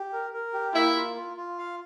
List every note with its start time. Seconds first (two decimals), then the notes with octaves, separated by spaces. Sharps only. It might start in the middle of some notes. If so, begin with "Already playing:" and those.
Already playing: G4
0.13 A#4
0.33 A#4
0.54 G4
0.74 A#3 E4
0.95 F4
1.16 F4
1.37 F4
1.58 F5